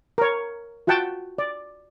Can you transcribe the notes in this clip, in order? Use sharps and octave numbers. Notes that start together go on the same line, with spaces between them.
A#4 C#5
F4 F#4 F#5 G5 A5
D5